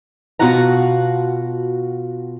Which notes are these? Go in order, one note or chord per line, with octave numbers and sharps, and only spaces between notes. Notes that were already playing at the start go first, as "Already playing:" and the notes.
B2 F4 F#4 F#5 A#5